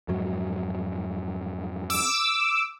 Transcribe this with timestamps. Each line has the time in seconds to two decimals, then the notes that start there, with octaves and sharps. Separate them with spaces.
0.08 F2 G#2 F#3
1.90 D6 E6